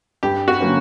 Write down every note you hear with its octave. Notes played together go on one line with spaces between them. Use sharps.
G2 G4
F#4
D3 F#3 A#3 C#4